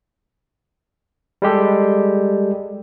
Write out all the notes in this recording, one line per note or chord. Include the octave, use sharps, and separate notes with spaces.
G3 G#3 G4 A4